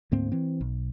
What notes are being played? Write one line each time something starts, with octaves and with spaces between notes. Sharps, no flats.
D2 G#2 A#3 C4
E3 C4
B1